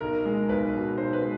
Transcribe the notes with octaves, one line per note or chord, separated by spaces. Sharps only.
B1 A#4
G#3
B1 B4
B2
B1 C5
B4
G#3